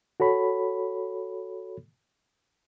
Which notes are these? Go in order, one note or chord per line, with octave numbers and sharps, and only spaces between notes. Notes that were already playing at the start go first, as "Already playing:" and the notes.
F#4 A4 C#5 B5